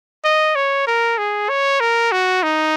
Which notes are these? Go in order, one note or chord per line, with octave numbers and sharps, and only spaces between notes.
D#5
C#5
A#4
G#4
C#5
A#4
F#4
D#4